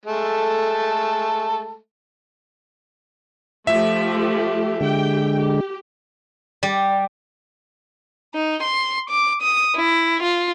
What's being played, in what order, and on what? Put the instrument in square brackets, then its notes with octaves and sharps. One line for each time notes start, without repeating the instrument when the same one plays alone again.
[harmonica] G#3 A3 A4
[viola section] F3 A3 G4 [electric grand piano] E5
[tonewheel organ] D3 G#3 [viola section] G4 G5
[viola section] G4
[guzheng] G3
[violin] D#4
C6
D6
D#6
E4
F4